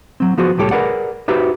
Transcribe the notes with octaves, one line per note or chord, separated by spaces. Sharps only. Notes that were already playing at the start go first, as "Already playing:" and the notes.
F#3 C4
F3 B3 F#4 G#4 C5
C2 A2 G3 G4 A4 C#5
G#4 A#4 B4 D5 F#5
D#4 F#4 G4 B4 C5 E5